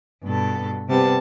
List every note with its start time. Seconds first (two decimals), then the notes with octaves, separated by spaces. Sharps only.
0.23 G2 B2 A4
0.88 C3 G3 B3 A5